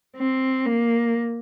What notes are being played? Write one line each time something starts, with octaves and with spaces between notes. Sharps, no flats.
C4
A#3